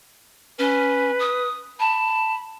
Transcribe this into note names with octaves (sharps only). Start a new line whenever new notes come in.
C#4 B4
D#6
A5 B5